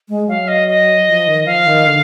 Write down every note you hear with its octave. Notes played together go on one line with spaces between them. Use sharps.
G#3
F#3 F5
D#5
D#5
F3
D#3
F3 F5
D#3
D3